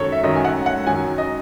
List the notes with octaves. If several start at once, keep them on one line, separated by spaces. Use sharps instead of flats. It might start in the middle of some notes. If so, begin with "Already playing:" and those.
Already playing: F#2 D#3 F#3 A4 C#5
E5
F#2 D#3 F#3 D#5
G#5
F#5
F#5
F#2 D#3 F#3 G#5
D#5